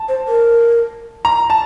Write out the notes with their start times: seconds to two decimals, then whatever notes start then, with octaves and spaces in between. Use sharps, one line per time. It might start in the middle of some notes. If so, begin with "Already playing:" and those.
Already playing: A5
0.09 C5
0.28 A#4
1.25 A#5
1.50 A5